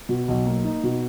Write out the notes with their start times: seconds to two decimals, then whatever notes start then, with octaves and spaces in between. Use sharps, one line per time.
0.09 B2
0.28 B1
0.46 A#3
0.65 D#4
0.83 B2